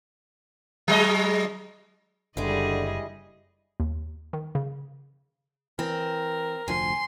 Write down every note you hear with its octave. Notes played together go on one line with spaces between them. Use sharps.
F#3 G#3 D#5
F#1 D3 E3 G3 G#3 G#4 D#5
D#2
D#3
C#3
E3 C4 A#4
F1 D2 F3 G#5 C6